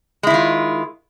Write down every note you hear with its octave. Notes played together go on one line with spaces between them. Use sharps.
D#3 G#3 E4 F4